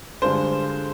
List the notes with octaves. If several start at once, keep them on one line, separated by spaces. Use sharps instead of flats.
G2 D3 G#3 D4 F4 C5